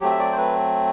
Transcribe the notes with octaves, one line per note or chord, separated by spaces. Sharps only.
F#3 A3 C4 G4
E5
D5
C5
B4